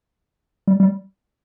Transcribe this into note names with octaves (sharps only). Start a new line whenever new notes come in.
G3
G3